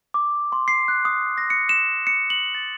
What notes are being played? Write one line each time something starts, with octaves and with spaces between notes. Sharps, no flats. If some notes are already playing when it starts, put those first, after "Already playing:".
D6
C6
C7
F#6
D#6
A#6
C#7
E7
C#7
F#7
A6